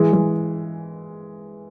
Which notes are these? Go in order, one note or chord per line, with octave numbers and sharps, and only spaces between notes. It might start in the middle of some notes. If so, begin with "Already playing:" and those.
Already playing: E3 G#3
E3 G#3